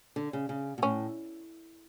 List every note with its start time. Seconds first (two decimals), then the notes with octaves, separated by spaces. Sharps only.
0.16 D3
0.33 C#3
0.49 C#3
0.78 B2
0.82 A2 C#4